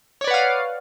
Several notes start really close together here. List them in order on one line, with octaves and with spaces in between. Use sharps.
C#5 D5 B4 F#5 F5